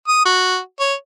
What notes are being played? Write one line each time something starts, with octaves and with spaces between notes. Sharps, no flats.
D#6
F#4
C#5